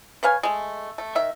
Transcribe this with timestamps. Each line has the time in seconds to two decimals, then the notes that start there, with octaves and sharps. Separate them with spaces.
0.23 B4 C#5 F5 G#5
0.43 G#3 A3
0.98 A3
1.15 D#3 E5